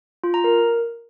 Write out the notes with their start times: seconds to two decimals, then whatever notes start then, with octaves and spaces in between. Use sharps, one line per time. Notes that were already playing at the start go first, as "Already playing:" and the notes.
0.24 F4
0.34 A#5
0.44 A#4